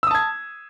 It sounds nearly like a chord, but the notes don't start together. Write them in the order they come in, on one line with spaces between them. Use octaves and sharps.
E6 D#6 A5 G#6